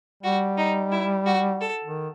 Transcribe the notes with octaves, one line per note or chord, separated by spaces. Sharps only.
G3 F#4
D#4
E4
F#4
A4
D#3